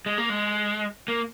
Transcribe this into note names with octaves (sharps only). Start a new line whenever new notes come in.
G#3
A#3
G#3
A#3